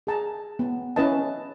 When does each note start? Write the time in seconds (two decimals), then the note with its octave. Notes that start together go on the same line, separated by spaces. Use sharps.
0.07 G#4 A5 A#5
0.59 B3
0.96 C#4 E4 B4 D#5 A5